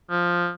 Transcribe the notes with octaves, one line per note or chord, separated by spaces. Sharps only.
F3